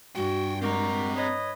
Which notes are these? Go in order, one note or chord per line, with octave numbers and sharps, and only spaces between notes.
G2 F#4 F#5 G5
G#3 C4 F#4 G4 A#4 A#5
B4 C#5 D#5